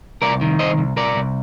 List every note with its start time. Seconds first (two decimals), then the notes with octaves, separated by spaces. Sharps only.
0.22 C2 A#4 D5
0.41 D#3
0.59 C2 C5 D#5
0.78 C2
0.96 C2 A#4 D5
1.16 C2